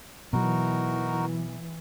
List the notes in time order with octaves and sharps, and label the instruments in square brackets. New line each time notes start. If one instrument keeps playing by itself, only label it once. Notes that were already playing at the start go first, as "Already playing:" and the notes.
[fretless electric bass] B2 F#3 [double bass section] E3 [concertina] D#4 F#4 A#4